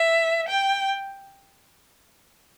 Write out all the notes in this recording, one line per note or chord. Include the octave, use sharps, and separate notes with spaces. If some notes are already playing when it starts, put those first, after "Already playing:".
Already playing: E5
G5